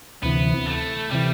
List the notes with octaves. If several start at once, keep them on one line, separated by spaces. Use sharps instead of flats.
D2 C3 E3 B3
A3
C3 E3 G3